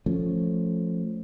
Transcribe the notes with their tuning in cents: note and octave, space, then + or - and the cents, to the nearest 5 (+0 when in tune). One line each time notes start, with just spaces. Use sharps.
F3 +0 A3 +0 C#4 +0